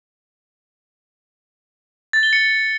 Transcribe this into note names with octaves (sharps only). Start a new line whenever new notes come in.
A6
G7
C#7